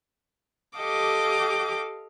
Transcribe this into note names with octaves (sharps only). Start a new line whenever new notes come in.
G4 A4 D#5 F5 D6